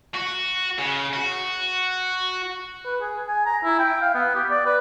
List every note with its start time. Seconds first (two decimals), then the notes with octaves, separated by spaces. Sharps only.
0.14 F#4
0.78 C#3
1.13 F#4
2.85 B4
3.01 G#4
3.28 G#5
3.46 A#5
3.64 E4
3.79 G5
4.01 F5
4.14 B3
4.35 G4
4.50 D5
4.66 B4